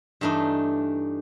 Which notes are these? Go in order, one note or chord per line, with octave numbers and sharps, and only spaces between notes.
G2 E3 A3 D4 D#4